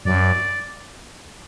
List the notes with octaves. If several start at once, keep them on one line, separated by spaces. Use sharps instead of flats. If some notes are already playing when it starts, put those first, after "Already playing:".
F#2 D5